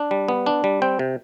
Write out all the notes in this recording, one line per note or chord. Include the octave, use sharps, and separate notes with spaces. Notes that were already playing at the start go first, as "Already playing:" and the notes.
Already playing: D4
G3
B3
D4
G3
C4 G5
C3